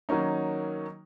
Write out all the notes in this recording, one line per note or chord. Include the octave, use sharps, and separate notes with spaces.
D#3 F#3 A#3 C#4 D#4